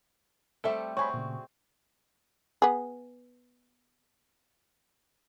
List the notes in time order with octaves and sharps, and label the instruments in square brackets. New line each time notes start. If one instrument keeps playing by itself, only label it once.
[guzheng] G3 A3 C4 [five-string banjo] A4 E5
[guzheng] C4 G#4 [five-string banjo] F#4 [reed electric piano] C#5 G#5 B5 [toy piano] C#6
[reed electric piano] A#2 C#3
[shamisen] B3 G#4